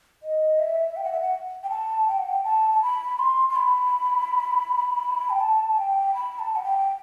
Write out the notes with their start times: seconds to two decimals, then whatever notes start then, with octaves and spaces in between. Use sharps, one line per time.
0.23 D#5
0.59 E5
0.97 G5
1.04 F#5
1.12 E5
1.20 F#5
1.64 G5
1.70 A5
2.08 G5
2.18 F#5
2.28 G5
2.44 A5
2.72 A5
2.82 B5
3.19 C6
3.50 C6
3.56 B5
5.30 G5
5.41 A5
5.78 G5
6.14 B5
6.39 A5
6.56 F#5
6.63 G5